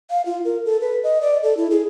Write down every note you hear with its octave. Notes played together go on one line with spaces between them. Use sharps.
F5
F4
A#4
A4
B4
D#5
D5
A4
E4
G#4